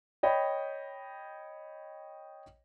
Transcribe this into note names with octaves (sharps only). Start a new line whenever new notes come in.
C#5 D#5 G5 B5